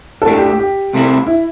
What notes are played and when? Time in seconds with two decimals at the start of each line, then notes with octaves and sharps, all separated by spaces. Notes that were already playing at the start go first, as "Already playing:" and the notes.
0.22 A4
0.26 A2 A3 D4 G4
0.38 G4
0.49 G4
0.59 G4
0.93 C2 C3 A3 C4 E4
1.27 E4